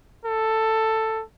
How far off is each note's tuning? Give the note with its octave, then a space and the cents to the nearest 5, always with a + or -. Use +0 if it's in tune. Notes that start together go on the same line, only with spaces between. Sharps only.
A4 +10